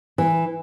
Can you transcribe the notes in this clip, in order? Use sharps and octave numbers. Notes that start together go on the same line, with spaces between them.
E3